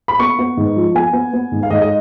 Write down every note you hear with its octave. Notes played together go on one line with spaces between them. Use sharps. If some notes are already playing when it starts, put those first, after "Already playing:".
B5
B3 C#6
B3
G#2
F3
B3 G#5
B3
B3
G#2
F5
G#2 D#5
D#5